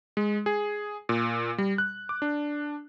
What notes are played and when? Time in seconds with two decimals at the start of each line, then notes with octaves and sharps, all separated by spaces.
0.17 G#3
0.46 G#4
1.09 A#2
1.58 G3
1.78 F#6
2.09 D6
2.22 D4